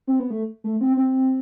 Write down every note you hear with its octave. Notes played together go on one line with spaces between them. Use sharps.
C4
B3
A3
A3
C4
C4